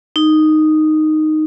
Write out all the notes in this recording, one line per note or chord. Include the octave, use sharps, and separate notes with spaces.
D#4